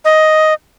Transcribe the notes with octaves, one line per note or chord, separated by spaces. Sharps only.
D#5